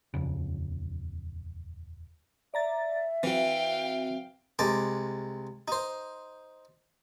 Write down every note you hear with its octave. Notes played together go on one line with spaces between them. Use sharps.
D#1 F2 C#3
D5 E5 A#5 A6
E3 C4 F#4 F5 G5
C2 G#3 A5 A#5 D6
D#4 C5